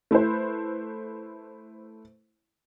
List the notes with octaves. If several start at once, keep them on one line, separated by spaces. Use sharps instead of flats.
A3 E4 B4 C5